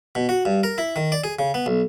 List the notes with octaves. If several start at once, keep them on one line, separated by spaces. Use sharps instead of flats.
B2
F#4
G2
A#4
E4
D#3
D5
G#4
C#3
B3
B1